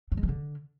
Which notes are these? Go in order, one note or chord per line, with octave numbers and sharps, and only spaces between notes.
F#3
G#3
E3
D3